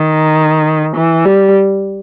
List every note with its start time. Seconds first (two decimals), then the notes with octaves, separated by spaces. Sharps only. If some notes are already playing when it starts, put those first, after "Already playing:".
Already playing: D#3
0.96 E3
1.25 G3